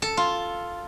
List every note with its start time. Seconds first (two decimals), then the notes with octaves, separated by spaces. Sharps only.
0.02 A4
0.17 F4